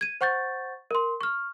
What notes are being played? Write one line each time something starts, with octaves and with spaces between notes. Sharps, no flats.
G#6 D#7
C5 F#5 C#6 G6 A6
A#4 C6
C#6 F6